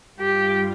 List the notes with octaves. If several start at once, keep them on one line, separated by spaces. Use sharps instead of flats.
G2 G3 F4 G4